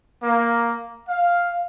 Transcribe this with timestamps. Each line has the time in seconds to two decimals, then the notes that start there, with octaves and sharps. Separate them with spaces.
0.23 A#3
1.08 F5